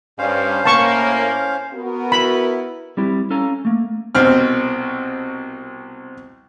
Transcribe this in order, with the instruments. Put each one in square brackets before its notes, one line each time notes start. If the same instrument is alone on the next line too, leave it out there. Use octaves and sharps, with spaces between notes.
[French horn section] G2 [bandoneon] C#4 C5 F5
[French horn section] A2 A#3 [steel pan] A5 C#6
[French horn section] B3 F#4 A#4
[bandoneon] E4 [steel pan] B5
[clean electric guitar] G3 C4 E4 G4
C#4 A4 F5 G#5 A#5
A3 A#3
[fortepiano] C2 B2 C4 F6